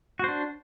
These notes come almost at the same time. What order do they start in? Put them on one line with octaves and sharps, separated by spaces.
F#4 C5 D4